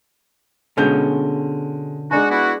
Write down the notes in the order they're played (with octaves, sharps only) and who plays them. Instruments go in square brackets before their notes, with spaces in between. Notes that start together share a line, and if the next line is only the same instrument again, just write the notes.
[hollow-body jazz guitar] B2 D3 C#4 [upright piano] G#3 G6
[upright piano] G#3 D4 G#5 [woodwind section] D#4 F#4
[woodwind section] B3 E4 F#4